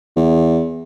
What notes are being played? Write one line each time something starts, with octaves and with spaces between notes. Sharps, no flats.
E2